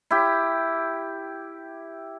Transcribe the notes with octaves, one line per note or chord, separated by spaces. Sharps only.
E4 G4